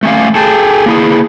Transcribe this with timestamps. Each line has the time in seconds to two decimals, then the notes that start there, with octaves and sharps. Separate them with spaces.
0.03 A3 C#4 F5
0.35 G#4 A4 G5 A5
0.86 A#3 E4 G#4